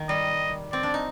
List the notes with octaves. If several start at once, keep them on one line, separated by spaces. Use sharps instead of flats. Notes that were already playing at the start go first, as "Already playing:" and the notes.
Already playing: D#3
G3 D#5
C4 D5
D4
D#4